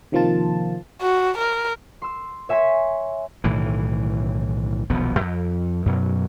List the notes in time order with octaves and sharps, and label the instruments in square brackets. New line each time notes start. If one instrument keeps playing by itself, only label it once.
[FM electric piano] C3 D#3 F3 A#3 F4 A5
[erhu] F#4
A#4
[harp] C6 E6
C#5 E5 G#5 C6 B6
[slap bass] B1 A2 D#3 E3
D#1 B1 F3 B3
F2
F#2 B2 F#3